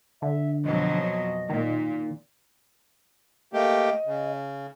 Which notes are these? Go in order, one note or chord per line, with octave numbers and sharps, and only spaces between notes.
D3 E5
F2 B2 F#3 D#5
A#2 D#3
A3 A#3 G4 D#5
C#3